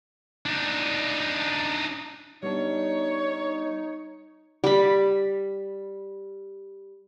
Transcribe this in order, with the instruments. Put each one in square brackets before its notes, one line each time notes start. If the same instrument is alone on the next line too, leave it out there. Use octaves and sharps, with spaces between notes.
[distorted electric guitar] D4 D#4
[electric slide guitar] G3 B3 D4 [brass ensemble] D#4 [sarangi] C#5
[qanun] G3 B5